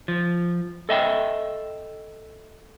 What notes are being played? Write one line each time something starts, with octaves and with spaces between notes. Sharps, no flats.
F3
A4 D#5 E5 G5